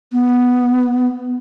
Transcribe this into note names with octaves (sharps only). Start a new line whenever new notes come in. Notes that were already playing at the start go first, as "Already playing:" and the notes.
B3